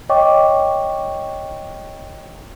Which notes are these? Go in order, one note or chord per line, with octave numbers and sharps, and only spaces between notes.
C#5 D#5 G5 C#6 D6